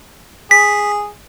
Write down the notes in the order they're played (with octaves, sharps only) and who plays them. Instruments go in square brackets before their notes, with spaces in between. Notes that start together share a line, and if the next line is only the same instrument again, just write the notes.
[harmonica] G#4 [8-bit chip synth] B6